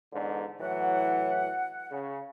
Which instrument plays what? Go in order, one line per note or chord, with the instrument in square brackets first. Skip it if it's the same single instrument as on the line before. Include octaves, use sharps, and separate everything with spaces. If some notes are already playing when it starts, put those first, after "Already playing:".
[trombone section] E2 G#2 D3
[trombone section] A2 E3 F#3 [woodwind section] F#5
[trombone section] C#3